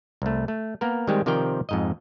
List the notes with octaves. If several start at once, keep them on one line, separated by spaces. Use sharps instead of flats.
C2 A3
A3
A#3 B3 A#4
D#3 G3 G#3 C4 G4
C3 D#3 F3 A#4 D5 G5
F2 G#2 D#5